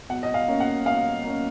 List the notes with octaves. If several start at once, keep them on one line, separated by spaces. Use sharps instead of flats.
B2 F#5
D#5
F5
A#3 C#4
F#5
B2 F5
A#3 C#4